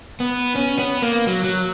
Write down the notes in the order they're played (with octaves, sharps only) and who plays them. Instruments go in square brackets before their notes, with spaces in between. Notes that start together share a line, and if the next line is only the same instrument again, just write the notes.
[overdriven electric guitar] B3
C#4
B3
A#3
F#3
F#3